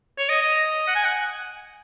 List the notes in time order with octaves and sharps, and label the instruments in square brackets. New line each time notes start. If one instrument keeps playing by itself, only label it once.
[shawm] C#5
D#5
D#5
F#5
G#5
F#5